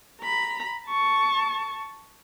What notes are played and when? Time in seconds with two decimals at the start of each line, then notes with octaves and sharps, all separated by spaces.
0.21 A#5 B5
0.88 A5 C#6